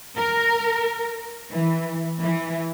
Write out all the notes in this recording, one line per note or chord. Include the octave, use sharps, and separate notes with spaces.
A#4
E3
E3